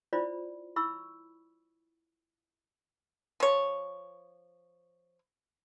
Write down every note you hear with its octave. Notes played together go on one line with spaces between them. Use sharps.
E4 F4 C5 D5 B5
E4 B5 C#6 E6
F3 C#5